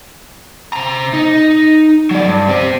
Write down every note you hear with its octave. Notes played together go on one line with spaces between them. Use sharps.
C3 A#5
D#4
F#3 D5
G2
C4 G4